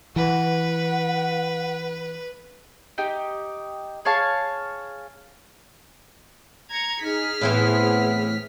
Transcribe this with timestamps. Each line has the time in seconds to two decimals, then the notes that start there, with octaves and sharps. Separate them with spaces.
0.16 E3 B4 F#5
2.98 D#4 G4 G5
4.05 G#4 C#5 F5 A5
6.70 A#5 G#6 C#7
7.03 D#4 G#4 F6 B6
7.41 A2 E3 B3 C4